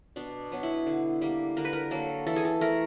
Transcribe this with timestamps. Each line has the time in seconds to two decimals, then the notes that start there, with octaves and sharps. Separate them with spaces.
0.16 B2 D4
0.52 F#3 B3
0.63 E4
0.86 D3
1.21 G3 A#3
1.57 D3 A#4
1.65 B4
1.73 A#4
1.91 F#3 A#3 A4
2.27 E3 A4
2.36 G#4
2.45 A4
2.61 A3 A#4